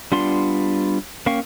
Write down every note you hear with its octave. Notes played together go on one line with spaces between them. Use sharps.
G3 B3 D4 F4 C6
A#3 C#4 F5 G5 C#6